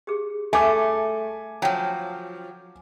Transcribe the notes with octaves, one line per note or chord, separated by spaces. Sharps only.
G4 G#4
A3 G#5 D6
F3 F#3 C#5 G5 A5